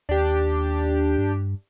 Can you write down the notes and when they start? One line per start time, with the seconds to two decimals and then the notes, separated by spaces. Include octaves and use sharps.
0.09 D#2 D4 G4
1.18 G2